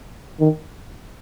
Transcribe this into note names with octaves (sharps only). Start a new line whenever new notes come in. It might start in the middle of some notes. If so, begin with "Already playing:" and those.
D#3